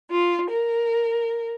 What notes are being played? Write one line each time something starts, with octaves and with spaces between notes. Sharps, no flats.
F4
A#4